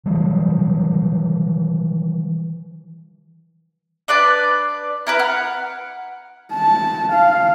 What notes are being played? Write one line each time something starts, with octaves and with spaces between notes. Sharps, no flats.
D#3 E3 F#3 G3
D4 B4 D5 A5
E4 A#4 B4
F#5 F6
A5
F5